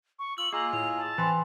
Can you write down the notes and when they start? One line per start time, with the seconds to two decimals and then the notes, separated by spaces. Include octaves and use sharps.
0.19 C#6
0.38 F4 E6 F#7
0.53 A#3 F4 G#4 D#5 A#5 E6
0.73 A2 F7
0.97 A5
1.18 E3 C4 G#5 B5 C6